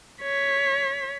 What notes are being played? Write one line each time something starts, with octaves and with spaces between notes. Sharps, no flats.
C#5 B6